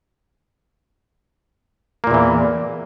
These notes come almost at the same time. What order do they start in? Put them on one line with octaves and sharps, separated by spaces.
A#3 A#2 E2 E3